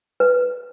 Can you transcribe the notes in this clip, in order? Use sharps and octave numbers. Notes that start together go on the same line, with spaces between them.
B4